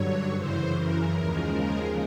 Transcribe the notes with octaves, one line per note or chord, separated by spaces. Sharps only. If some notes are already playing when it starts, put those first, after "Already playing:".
Already playing: G2 D3 F#3 C#5
F#2 C#3 E3 C5
A#4
D#2 C#3 F3 G#3